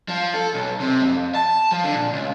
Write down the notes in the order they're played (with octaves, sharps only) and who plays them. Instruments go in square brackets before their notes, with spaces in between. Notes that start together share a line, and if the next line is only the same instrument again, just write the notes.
[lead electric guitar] F3
A4
B1
C3
F2
A5
F3
D3
A#2
C#2